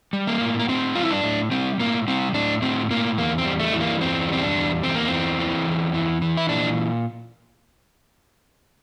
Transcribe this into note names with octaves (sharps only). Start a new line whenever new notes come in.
G3
A#3
A2
A#3
A2 C4
G3 F4
E4
D4
A2
G3 C4
A2 A#3
G3 C4
A2 D4
A2 C4
A2 A#3
E2 A#3
C4
G3
A3
E3
A#3
E2 C4
G3 C4
D4
E2
E2 C4
A#3
E3 C4
E3
E2
E3
E3
E4
A#2 D4